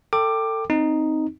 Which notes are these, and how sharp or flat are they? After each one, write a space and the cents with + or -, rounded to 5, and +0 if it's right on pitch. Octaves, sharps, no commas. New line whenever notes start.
A4 +25 G5 +0 D6 +15
C4 +0 D#4 +0